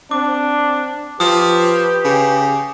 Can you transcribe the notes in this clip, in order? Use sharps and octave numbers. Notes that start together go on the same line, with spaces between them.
C4 D4 D6
F3 G4 B4 D#6
C#3